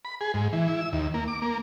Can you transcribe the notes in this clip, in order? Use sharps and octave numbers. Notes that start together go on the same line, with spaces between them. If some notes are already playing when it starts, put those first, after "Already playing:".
B5
G#4
G#2
E3
E4
E6
D#2
A#3
D6
A#3